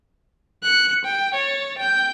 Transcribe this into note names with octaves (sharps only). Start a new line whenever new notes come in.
F#6 C#7
G5
C#5 A6
G5 G6